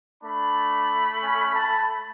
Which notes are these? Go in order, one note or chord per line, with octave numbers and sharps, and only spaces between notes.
A3 D4 B5
C#4
A5